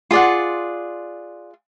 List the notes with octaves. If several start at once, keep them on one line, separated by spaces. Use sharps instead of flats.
F4 G#4 D5 F#5